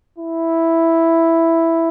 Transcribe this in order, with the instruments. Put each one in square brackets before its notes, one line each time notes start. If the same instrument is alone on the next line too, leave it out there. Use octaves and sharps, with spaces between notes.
[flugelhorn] E4